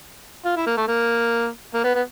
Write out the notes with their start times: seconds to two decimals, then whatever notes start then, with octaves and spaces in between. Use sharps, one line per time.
0.45 F4
0.57 E4
0.67 A#3
0.77 A3
0.88 A#3
1.74 A#3
1.84 B3
1.95 B3